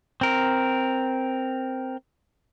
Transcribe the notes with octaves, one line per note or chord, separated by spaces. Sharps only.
C4 A#4